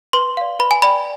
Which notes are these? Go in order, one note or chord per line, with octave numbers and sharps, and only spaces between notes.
B4 C6
D5 F5
B4 B5
G#5
D5 G5 B5